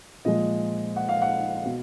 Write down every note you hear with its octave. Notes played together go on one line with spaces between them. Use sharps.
A#2 F3 G#3 D#5
F#5
F5
F#5
B2